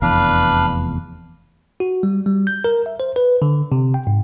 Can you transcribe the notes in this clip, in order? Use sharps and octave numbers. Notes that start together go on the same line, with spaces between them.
F1 E2 D4 B4 F5
F#4
G3
G3
G6
A#4
E5
C5
B4
D3
C3
G5
G#2